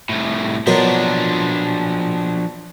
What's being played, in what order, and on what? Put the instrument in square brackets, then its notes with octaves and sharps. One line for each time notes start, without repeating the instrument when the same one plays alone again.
[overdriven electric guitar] C2 A2
[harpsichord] B2 F#3 A#4 [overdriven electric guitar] F3 D4